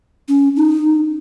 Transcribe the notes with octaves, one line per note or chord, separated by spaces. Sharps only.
C#4
D#4